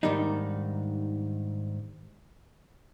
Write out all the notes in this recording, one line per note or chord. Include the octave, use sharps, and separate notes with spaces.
G#2 D#3 G3 A#3 D4 D#4